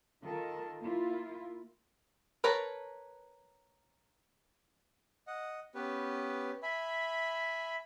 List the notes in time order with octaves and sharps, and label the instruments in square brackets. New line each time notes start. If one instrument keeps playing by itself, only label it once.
[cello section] D#3 F4 A4 A#4
A#3 E4 F4
[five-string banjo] A#4 B4 C#5 A5 A#5
[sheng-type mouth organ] D#5 F#5
B3 C#4 G4 B4
E5 G#5 B5